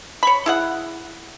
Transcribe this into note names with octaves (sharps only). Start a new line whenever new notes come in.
C#5 B5
E4 G#4 F#5